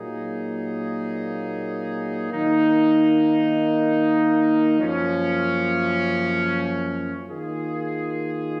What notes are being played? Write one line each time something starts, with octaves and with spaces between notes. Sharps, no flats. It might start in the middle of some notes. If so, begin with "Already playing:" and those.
Already playing: A#2 F#3 A#3 D#4 G#4
D#3 A#3 D#4
F#2 F3 A#3 C#4
D#3 A#3 F4 G#4